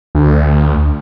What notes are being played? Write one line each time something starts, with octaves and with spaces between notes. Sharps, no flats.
D2